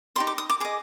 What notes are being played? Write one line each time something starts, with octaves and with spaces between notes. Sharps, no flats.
D#4 G4 D5 C6
D6
D#6
D6
G#4 D#5 D6